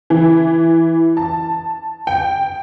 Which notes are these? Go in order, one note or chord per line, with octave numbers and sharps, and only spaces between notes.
E3
A5
G5